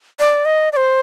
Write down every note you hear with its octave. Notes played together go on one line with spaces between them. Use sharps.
D5
D#5
D5
C5